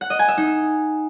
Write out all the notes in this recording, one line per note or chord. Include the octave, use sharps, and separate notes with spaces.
F#5
D#5
G#5
E5
D#4